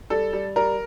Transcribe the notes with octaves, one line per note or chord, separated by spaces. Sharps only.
G3 A4
G3
G3 A#4